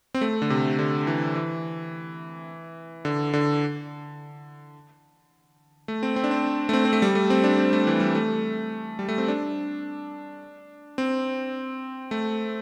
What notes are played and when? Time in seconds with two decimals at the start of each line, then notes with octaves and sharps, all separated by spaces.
0.14 C4
0.21 A3
0.42 D3
0.50 C3
0.79 D3
1.07 E3
1.36 E3
3.05 D3
3.33 D3
5.88 A3
6.03 C4
6.16 C4
6.24 D4
6.31 C4
6.69 A3
6.73 C4
6.85 C4
6.93 A3
7.02 G3
7.15 A3
7.30 C4
7.44 D4
7.58 C4
7.73 A3
7.87 E3
8.00 G3
8.15 A3
8.99 G3
9.09 A3
9.18 C4
9.28 D4
10.98 C4
12.11 A3